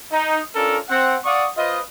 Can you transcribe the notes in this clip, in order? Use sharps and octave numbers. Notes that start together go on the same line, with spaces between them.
D#4
C#4 D4 F4 A4 A#4
C4 F#5
D5 F5 F#5 C#6 D#6
F4 B4 C5 D#5